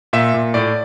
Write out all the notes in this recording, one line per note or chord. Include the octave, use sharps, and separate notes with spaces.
A#2 E5
A#2
A2 D5